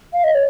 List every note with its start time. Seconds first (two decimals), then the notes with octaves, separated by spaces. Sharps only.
0.13 F5
0.24 D#5
0.35 C#5